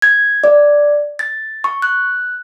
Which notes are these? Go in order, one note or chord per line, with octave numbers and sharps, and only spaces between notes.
G#6
D5
A6
C#6
F#6